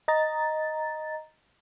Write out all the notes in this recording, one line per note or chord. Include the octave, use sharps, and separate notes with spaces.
D#5 A#5 A6